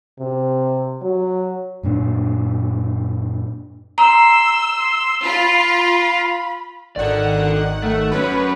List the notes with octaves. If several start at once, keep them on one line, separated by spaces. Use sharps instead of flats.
C3
F#3
F#2 A#2 D4
A#5 C6 E6
F4 B5
G#1 D#3 A4 D5 F#5
A3
F#2 C#4 B4